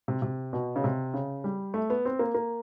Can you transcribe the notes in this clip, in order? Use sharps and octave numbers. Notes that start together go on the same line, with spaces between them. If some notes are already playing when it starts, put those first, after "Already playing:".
C3
C3
B2
C#3
C3
C#3
G3
A3
B3
C4
A#3
A#3